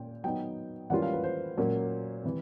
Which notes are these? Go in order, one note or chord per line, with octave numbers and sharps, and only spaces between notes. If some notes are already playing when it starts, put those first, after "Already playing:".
Already playing: A#2 C#4 G5
F#3 B3 D#4 G5
E3 G3 A#3 C#4 F4 F#5
F5
B4
C5
A#2 F#3 A#3 C#4
C3 E3